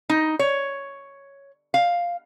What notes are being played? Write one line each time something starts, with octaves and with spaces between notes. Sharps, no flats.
D#4
C#5
F5